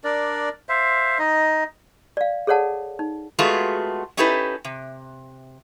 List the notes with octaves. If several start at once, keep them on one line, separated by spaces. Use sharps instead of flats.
D4 A#4 D5
C5 E5 F5
D#4 D#5
D5 F5
G#4 A4 C#5 D5 F#5 A5
D#4
G#3 A3 B3 F4 F#4 G#4
C#4 D#4 E4 G4 A4 B4
C3